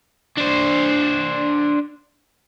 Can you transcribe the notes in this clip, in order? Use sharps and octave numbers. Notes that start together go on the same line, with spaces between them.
D4 C5